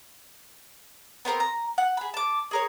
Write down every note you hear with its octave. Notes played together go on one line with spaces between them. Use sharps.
B3 C4 A#4 C5
A#5
F#5
G#4 B5
A5 D6
G#4 A#4 C#5